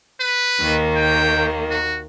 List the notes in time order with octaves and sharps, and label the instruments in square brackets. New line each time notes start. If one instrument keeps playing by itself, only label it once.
[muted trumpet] B4
[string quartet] D#2 D#3 A#3
[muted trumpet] G5
F#4